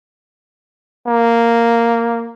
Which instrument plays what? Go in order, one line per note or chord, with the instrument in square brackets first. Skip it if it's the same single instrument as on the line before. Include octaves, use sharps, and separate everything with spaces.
[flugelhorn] A#3